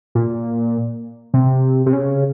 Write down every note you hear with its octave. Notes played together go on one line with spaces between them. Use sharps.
A#2
C3
C3
C#3